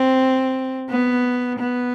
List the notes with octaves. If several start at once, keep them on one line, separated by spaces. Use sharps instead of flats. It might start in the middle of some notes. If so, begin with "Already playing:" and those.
Already playing: C4
B3
B3